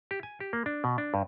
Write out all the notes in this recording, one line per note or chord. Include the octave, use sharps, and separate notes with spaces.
G4
G#5
G4
A#3
D4
B2
D4
G2